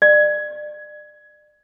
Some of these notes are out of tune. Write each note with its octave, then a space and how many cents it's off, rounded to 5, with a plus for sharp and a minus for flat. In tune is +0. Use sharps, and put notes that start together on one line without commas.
D5 +35